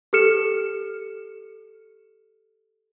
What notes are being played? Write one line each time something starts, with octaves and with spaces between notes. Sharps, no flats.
G4 A4 F6 C#7 E7